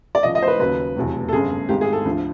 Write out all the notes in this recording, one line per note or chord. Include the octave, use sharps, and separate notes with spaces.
D5
C#2 C#3 F3 D#5
D#5
C5
B4
D#2 C#3 F#3 B4
F1 E2 B2 F#3
A4
G1 F#2 C#3 G#4
G#1 G#2 D#3 G4
G#4
A4
D2 D3 F3